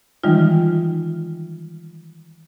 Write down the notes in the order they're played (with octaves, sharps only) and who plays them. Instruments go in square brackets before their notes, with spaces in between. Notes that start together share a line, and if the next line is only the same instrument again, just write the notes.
[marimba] D#3 E3 G3 G#3 D#4 F4